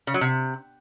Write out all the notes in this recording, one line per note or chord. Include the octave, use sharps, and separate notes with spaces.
C#3
F#3
C3